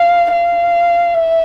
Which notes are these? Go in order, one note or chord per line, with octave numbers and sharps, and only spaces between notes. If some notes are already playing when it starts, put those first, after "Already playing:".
Already playing: F5
F5
E5